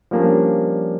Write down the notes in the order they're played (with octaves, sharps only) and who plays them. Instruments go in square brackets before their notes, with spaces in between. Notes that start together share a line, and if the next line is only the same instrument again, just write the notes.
[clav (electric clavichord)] F3 G3 A#3 C#4 D4